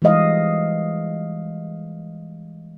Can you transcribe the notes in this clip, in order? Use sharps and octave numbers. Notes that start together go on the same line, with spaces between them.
E3 G3 G#3 D#5 F5